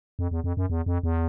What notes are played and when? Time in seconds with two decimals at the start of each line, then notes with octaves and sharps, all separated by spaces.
0.19 F2
0.31 E2
0.44 F2
0.57 F#2
0.70 E2
0.86 F2
1.03 E2